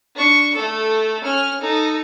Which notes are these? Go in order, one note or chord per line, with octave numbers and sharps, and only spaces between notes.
D4 C#6
A3 A4
C#4 F6
D#4 A4